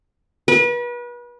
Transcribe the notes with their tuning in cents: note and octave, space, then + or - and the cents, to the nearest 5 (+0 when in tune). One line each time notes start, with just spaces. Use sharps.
B4 -35